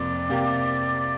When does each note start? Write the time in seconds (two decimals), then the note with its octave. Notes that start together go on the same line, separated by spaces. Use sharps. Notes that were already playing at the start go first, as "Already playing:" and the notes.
Already playing: F2 C3 A#3 D5
0.29 C3 A#3 G4